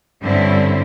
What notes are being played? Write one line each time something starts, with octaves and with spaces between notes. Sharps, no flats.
G2 D3 C4 C#4 E4 C5